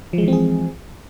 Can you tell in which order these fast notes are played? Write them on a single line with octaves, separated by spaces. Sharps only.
F3 G#3 E3 C4 G#4